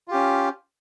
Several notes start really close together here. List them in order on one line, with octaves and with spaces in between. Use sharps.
F4 G4 C#4